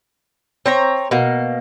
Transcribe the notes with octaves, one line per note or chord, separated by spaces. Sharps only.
C4 C#5 A#5
B2 A#3